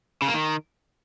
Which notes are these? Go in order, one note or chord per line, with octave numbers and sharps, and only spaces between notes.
C#3
A#3
D#3